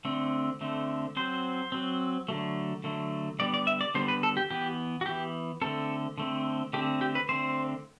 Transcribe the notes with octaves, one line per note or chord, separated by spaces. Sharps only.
D3 A3 C4
D3 A3 C4
F#3 C4 C5
F#3 C4
D3 F#3 A3
D3 F#3 A3
D3 G3 B3 D5
D5
E5
D5
D3 G3 B3 C5
B4
A4
G4
E3 B3 G4
F#4
E3 B3 G4
D3 A3 C4 A4
D3 A3 C4
D3 A3 C4 G4
G4
B4
D3 A3 C4 C5